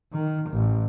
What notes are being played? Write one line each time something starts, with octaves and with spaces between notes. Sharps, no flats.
D#3
A1